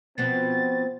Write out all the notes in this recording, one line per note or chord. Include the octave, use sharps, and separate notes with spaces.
B2 F3 B3 C4 A6